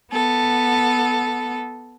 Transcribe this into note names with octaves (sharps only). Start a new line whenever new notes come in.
B3 A4